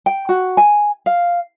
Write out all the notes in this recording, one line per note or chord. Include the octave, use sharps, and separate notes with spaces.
G5
F#4
G#5
F5